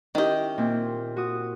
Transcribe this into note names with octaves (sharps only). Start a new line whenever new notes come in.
D#3 C#4 E4 G4 D#5
A#2 C4
F#4 D#6